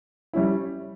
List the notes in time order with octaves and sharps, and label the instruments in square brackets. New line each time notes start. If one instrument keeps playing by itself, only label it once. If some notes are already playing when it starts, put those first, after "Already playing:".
[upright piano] G3 C#4 E4